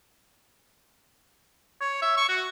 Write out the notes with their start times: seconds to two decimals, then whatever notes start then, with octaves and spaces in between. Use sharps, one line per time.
1.81 C#5
2.02 E5
2.17 C#6
2.29 F#4